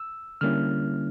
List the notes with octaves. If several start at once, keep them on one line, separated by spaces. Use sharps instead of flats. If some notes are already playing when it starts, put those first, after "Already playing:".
Already playing: E6
D3 G3 A#3 C#4 E4 F6